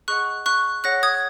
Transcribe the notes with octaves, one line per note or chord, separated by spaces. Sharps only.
G#4 D#5 F#5 C#6 F#6
C#6 F#6
G#4 C#5 F#5 F#6 A#6
D#6 G#6